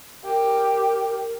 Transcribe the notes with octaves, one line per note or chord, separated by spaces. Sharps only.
G4 A#4